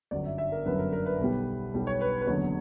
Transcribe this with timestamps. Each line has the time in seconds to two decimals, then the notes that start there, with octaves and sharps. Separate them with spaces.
0.11 G1 F#2 D3 F#3 D5
0.25 E5
0.38 E5
0.52 A#4
0.65 G1 F#2 D3 F#3 B4
0.79 A#4
0.93 A#4
1.06 B4
1.19 B1 B2 G3
1.74 B1 B2 G3
1.87 C#5
2.01 B4
2.21 B4
2.27 F#1 E2 D3 F#3 C#5